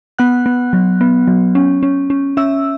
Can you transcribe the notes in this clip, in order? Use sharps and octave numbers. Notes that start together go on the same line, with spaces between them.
B3 F#5 F#6
B3
F#3
B3
F#3
C#4
C#4
C#4
C#4 E5 E6